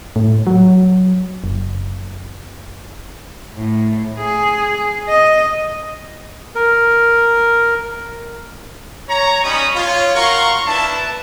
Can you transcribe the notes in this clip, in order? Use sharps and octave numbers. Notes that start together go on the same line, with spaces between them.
A2
F#3
F#1
A2
G#4
D#5
A#4
C#5 A#5
G3 C#4 D#4 B5 C#6 D#6
F4 C#5
F#4 A#4 F5 A#5 C6 C#6
D4 E4 B4 A5